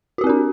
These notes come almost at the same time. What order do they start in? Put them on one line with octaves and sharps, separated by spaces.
F#4 G4 C4 A#4 D4